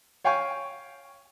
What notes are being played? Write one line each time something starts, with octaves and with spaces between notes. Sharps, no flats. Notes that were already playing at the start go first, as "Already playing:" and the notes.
C#5 F5 G5 G#5 C#6